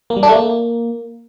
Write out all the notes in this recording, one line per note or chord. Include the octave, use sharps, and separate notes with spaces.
A#3
G3
D4
A3
A#3